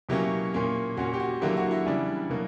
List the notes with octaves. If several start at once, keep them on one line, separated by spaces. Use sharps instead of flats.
B2 F#3 A#3 C#4 E4 G4
A#2 A#3 C#4
A#2 A#3 C#4 F#4
G4
F#4
D3 F#3 A#3 E4 G4
F#4
E4
C#3 E3 G3 B3 D4
B2 F#3 A#3